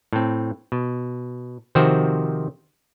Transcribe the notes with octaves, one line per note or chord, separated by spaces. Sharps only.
A2 C4
B2
C3 D#3 F3 C4 F#4 C5